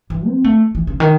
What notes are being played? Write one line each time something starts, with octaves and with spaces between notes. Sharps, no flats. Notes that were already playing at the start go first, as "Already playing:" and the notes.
E3
C4
A3
E3
C#3
D#3